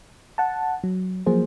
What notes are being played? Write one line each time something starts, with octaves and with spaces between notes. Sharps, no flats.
F#5 A5
F#3
F3 F#3 A#3 G#4 C5